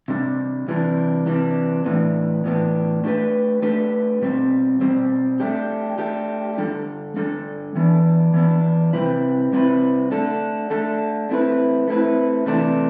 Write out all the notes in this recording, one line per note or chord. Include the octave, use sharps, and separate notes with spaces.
C3 G3 D4
C3 E3 G3 D4
C3 E3 G3 D4
A2 E3 B3 D4
A2 E3 B3 D4
A3 D4 G4 B4
A3 D4 G4 B4
B2 G3 C4
B2 G3 C4
A3 D4 G4
A3 D4 G4
D3 G3 D4 A4
D3 G3 D4 A4
E3 B3 D4
E3 B3 D4
C3 G3 C4 E4 B4
C3 G3 C4 E4 B4
A3 D4 A4
A3 D4 A4
A3 C4 E4 B4
A3 C4 E4 B4
C3 E3 A3 D4